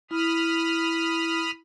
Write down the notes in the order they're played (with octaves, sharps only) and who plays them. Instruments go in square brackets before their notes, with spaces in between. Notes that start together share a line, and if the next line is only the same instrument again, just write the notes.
[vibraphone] E4 [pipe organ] B5 D#6 F6